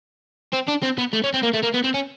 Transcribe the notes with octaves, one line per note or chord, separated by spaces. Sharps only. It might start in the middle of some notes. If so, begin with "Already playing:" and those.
C4
D4
C4
B3
A3
C#4
C4
A#3
A3
A#3
B3
C4
C#4